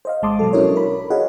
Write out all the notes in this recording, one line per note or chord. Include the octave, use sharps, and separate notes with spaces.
C5 D#5 F5
G#1 G#3 A5 C6 D6 D#6
B2 F#3 A4
C#4 D4 E4 F#4 A#4 C#5
A#4 B5
F#4 G#4 C#5 D#5 F5 F#5